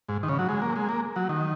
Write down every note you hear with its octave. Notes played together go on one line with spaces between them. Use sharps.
G#2
D#3
C#3
F#3
G#3
A#3
G#3
A#3
F#3
D#3